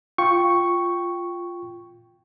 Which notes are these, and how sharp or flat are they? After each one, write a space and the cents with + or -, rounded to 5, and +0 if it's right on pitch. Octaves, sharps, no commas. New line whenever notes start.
F4 +0 G5 +0 C#6 +0